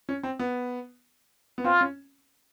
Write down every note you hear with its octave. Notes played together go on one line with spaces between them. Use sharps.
C#4
C4
B3
B3
C4 F4
C#4